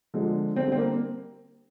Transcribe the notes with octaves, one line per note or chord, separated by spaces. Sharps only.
D3 F3 G#3
D3 G3 C4
C4
A#3